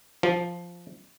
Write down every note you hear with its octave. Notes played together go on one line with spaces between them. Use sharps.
F3